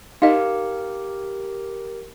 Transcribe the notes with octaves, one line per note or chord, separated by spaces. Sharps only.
D#4 G4 A#4 D#5 F5